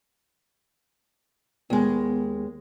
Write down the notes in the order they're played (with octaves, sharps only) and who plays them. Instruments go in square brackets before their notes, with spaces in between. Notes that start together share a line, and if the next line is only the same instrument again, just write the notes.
[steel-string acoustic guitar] D#2 G#3 [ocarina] B3